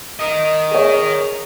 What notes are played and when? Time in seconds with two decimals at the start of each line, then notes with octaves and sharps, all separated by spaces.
0.19 A#4 D#5
0.71 G#4 C#5